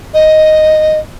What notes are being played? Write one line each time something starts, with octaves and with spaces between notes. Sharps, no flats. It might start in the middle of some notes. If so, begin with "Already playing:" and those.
D#5